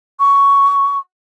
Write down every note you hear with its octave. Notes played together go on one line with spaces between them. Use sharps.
C#6